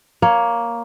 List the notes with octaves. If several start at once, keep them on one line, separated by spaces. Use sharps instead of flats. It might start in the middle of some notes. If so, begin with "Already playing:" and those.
A#3 C#5